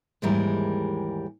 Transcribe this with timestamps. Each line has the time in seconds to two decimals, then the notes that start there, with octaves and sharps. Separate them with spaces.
0.22 D#2 G#2 E3 G3 G#3 A#4